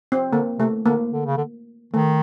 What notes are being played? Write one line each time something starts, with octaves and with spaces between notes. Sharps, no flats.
C4
D3 A#3
C3 A3
D3 A#3
D3
C#3
D3
D#3 A3